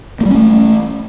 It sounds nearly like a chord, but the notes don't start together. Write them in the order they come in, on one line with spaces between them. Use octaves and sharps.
A#3 G3 C#4 A3